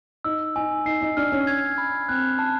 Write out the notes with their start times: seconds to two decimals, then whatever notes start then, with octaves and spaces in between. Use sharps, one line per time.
0.25 D#4 E6
0.56 D#4 G#5
0.86 D#4 C7
1.02 D#4
1.17 D4 F6
1.32 C#4
1.47 G#6
1.78 B5
2.09 C4 F#6
2.39 A5